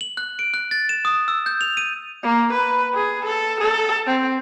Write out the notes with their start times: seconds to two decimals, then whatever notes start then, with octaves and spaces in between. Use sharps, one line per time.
0.01 F#7
0.17 F#6
0.39 D7
0.54 F#6
0.71 A6
0.89 E7
1.05 D#6
1.28 E6
1.46 G6
1.61 F7
1.77 D#7
2.23 A#3
2.53 B4
2.95 G#4
3.25 A4
3.61 A4
4.07 C4